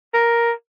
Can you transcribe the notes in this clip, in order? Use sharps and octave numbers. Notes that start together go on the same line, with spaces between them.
A#4